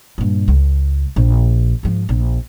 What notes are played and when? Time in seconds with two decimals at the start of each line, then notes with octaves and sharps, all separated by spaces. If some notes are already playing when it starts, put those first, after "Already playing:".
0.18 G2 A#2
0.48 C#2
1.16 A#1
1.83 G#2 F3
2.09 A#1